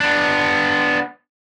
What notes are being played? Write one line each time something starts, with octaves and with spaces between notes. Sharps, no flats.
B3 D4